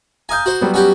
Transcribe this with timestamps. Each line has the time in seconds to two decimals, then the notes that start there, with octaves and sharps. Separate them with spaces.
0.29 F5 G#5 A#5 D#6 G6
0.46 F#4 C5
0.61 F#3 G3 B3
0.74 C#4 F#4 G4